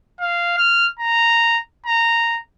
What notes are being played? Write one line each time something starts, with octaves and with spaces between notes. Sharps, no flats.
F5
F6
A#5
A#5